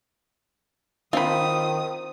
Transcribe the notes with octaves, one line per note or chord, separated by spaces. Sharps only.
D#3 C4 F4 B5 D#6